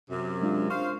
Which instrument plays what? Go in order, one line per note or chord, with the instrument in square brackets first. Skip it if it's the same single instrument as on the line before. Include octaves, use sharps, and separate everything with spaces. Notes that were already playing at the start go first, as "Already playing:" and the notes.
[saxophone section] F#2 C3
[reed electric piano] G#3 D4 F4
[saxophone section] C5 F5 [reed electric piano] C#6